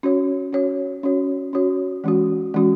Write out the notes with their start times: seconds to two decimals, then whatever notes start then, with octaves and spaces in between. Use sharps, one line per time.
0.03 C#4 F#4 C#5
0.53 C#4 F#4 C#5
1.03 C#4 F#4 C#5
1.53 C#4 F#4 C#5
2.04 E3 G#3 C#4 F#4
2.54 E3 G#3 C#4 F#4